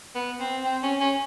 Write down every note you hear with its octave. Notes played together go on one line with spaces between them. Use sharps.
B3
C4
C4
C#4
C#4